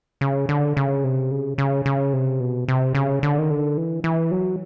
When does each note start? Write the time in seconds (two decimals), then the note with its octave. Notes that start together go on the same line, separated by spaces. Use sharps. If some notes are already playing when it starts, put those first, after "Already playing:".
0.21 C#3
0.49 D3
0.77 C#3
1.04 C3
1.31 C#3
1.58 C#3
1.86 C#3
2.13 C3
2.40 B2
2.68 C3
2.95 C#3
3.23 D3
3.38 D#3
3.50 D3
3.77 E3
4.04 E3
4.31 F#3